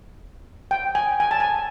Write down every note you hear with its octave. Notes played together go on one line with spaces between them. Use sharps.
G5
G#5
G#5
A5
G#5